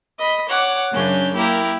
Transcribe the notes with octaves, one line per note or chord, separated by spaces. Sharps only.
D#5 B5
C#5 F#5 D6
F#2 C#3 C#4 D4 G6
A#3 E4 G4 A#4